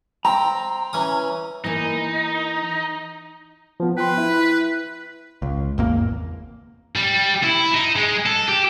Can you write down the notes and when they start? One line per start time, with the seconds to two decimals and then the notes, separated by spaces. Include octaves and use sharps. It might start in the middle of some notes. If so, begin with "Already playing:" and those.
0.25 C4 G5 A#5
0.93 E3 C#4 D#6
1.64 E3 A#3 D#4
3.80 F3 B3
3.97 B4 G5 C6
4.18 E4
5.42 C#2
5.78 G#1 E2 A#3
6.96 G3
7.43 E4
7.74 D#4
7.96 G#3
8.26 A4
8.48 G4